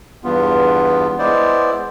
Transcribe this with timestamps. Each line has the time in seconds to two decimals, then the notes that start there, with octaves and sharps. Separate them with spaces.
0.24 E2 G2 B3 F4
1.19 G#3 B3 E4 C5 D5